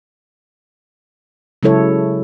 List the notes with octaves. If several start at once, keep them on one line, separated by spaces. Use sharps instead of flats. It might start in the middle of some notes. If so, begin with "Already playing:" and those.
C#3 F#3 G#3 E4 A4 C#5